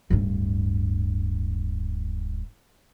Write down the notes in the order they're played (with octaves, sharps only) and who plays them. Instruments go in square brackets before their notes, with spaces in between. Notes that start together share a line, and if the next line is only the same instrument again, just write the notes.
[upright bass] D1 G2